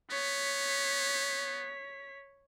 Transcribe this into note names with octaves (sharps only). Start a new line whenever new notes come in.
B3 C#5 B6